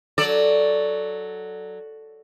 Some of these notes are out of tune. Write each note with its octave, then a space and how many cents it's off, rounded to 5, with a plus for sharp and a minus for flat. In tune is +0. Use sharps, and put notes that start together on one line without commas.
F#3 +0 A4 +0 D5 +0